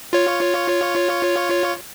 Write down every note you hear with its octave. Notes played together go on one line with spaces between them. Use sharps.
F4 C#5